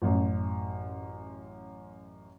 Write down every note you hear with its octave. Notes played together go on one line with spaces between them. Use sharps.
A1 F#2